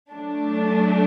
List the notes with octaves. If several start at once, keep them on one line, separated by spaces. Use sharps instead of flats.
F#3 A3 D4